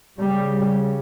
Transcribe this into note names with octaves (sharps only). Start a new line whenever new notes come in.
C#3 G3